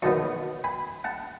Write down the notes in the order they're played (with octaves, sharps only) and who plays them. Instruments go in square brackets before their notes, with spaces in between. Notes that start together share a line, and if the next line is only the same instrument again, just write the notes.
[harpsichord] F#2 D#3 F#3 B3 A5 C#6
G#5 B5
F#5 A5